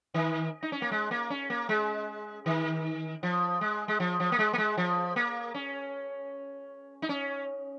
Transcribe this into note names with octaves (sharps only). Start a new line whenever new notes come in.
D#3
D#4
C#4
A#3
G#3
A#3
C#4
A#3
G#3
D#3
F3
G#3
G#3
F3
F3
A#3
G#3
A#3
G#3
F3
A#3
C#4
D#4
C#4